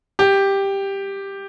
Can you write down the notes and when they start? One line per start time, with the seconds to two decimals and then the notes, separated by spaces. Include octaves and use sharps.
0.19 G4